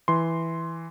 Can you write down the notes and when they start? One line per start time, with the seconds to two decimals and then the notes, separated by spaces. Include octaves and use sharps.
0.08 E3 C6